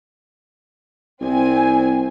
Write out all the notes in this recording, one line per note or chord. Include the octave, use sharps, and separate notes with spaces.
C2 C4 G#5